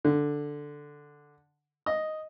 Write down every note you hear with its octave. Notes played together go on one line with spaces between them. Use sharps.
D3
D#5